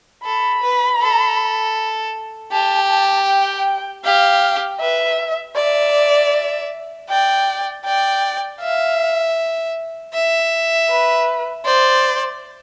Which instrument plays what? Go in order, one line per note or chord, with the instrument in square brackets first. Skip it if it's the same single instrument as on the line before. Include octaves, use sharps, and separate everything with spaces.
[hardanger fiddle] A4 [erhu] B5
[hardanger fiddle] B4
A4
[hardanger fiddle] G4 [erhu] A5
[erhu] A5
G5
[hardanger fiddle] G4 [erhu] F5
[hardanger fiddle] B4 [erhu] E5
[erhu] D5 [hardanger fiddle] E5
[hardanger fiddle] D5 [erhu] G5
[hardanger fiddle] D5 [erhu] G5
[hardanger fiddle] E5 [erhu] F5
[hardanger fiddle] E5
[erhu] B4
[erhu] C5 [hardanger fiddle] D5